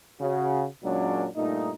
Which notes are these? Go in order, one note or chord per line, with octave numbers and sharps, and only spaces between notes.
C#3 F#4
F#2 A#2 F#3 G#3 C#4 D4
G2 A#2 A3 D#4